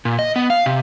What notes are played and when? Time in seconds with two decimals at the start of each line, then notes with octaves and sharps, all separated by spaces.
0.05 A#2
0.19 D#5
0.36 B3
0.50 F5
0.66 C3